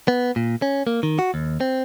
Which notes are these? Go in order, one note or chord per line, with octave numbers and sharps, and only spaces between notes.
B3
A#2
C#4
A#3
D#3
F#4
D#2
C4